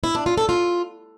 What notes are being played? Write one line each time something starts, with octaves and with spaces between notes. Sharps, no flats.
E4
D4
F4
A4
F4